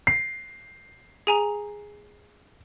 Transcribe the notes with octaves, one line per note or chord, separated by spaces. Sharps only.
C7
G#4 G#5 A#5